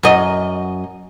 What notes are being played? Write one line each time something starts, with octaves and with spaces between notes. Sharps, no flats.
F#2 D#5